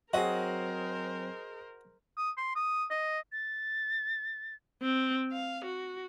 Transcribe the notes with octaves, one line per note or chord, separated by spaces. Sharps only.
F#3 C4 F#4 G#4 A#4 C5 D#5
D#6
C6
D#6
D#5
A6
C4
F5
F#4